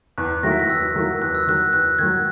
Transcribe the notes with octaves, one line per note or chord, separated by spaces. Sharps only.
E2 F#6
D#3 F#3 A#3 E4 A#6
B6
A#6
E2 E6
D#3 F#3 A#3 E4
E2 F#6
E6
D#3 F#3 F#6
E2 F#6
D#3 F#3 G#6